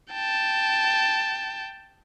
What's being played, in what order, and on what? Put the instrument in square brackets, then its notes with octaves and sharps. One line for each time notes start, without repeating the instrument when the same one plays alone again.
[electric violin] G5 A5